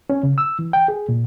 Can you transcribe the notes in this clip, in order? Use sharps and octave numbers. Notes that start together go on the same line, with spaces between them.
C#4
C#3
E6
E3
G5
G#4
A#2